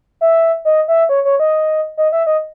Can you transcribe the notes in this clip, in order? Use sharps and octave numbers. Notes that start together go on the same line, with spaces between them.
E5
D#5
E5
C#5
C#5
D#5
D#5
E5
D#5